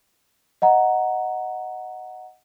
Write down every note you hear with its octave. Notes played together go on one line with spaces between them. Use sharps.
D#5 F#5 A#5